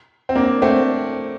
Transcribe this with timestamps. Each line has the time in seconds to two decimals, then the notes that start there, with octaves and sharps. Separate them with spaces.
0.29 C4
0.35 A#3 D4
0.62 A3 C4